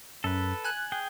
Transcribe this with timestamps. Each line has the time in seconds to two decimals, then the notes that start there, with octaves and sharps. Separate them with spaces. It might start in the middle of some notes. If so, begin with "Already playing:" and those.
0.24 F#2 A4 B4
0.64 G#5 F#6
0.92 G#4 G5